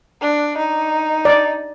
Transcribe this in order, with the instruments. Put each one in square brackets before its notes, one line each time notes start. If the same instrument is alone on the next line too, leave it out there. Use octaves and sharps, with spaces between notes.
[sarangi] D4
D#4
[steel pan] D5